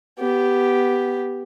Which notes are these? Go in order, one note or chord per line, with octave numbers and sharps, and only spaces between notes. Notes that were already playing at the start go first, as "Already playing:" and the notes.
B3 G4